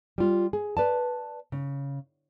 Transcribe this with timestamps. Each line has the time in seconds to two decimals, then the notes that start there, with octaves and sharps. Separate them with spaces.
0.18 G3 F4
0.53 G#4
0.77 B4 D5 A5
1.52 C#3